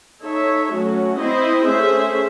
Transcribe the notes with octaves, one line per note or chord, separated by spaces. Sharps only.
D#4 A4 C#5 E5
F#3 A3 C#4 F#4
C4 E4 C5 D#5
A3 C#4 G#4 C5 E5